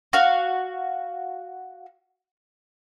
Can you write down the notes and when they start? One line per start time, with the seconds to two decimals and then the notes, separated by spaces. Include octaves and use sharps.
0.13 F#4 F5